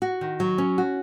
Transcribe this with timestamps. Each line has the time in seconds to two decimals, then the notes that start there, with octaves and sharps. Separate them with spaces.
0.02 F#4
0.21 D#3
0.40 F#3
0.58 C#4
0.78 F#4